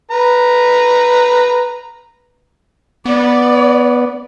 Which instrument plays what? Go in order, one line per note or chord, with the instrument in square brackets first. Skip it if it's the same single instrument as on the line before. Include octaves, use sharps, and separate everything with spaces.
[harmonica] B4 A#5
[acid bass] B3 [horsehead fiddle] D5